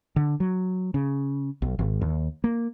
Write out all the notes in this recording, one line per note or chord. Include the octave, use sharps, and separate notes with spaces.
D3
F#3
C#3
B1
G#1
D#2
A#3